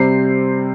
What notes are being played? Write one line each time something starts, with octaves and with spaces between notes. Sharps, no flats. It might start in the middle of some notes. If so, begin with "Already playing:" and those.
Already playing: C3 G3 C4 C7